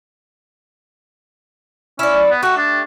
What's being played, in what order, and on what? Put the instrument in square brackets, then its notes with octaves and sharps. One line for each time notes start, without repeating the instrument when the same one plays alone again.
[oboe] C#4 [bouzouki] E4 D5
[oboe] B3
[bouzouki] A3 G4 [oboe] F#4
[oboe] D4